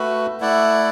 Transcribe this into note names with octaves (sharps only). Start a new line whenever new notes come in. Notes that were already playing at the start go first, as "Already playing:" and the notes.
Already playing: A3 F#4 B4
A3 E4 D5 F#5